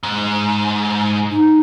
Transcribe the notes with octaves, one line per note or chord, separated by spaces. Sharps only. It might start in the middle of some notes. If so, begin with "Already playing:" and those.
G#2
D#4